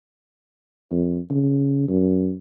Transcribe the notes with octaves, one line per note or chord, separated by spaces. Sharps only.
F2
C#3
F#2